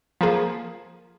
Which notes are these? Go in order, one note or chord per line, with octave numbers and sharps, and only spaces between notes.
F3 A#3 G#4